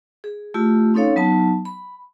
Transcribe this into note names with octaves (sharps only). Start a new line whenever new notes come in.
G#4
A3 E4 F4 G4
C4 C#4 D#4 A4 C#5 F5
F#3 B3 D#4 A5
B5